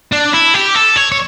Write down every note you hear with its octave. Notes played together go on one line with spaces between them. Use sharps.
D4
E4
G4
A4
C#5
C#5